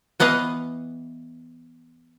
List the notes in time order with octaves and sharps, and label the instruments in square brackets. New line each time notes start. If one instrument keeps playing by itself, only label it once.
[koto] E3 B3 D#5 F5 F#5